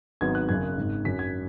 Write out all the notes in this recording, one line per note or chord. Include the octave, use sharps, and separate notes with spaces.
G#1 G#2 F#3 B3 G#6
F#6
F#1 F#2 C#3 G#6
G#1 G#2 D#3
F#2 F#3 C#4 B6
G#6